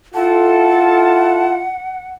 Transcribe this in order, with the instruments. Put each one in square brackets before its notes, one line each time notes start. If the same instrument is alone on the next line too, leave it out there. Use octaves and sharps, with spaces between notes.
[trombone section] E4 F4 [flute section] A4 [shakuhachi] F#5 [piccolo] A5